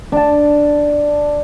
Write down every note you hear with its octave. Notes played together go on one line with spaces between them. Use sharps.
D4 A5